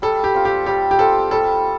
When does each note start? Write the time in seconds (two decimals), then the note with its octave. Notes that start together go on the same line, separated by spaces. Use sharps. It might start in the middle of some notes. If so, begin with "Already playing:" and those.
0.02 G3 A4
0.24 G4
0.34 C4 F4
0.45 G4
0.66 G3 G4
0.91 G4
0.99 C4 F4 A4
1.31 G3 A4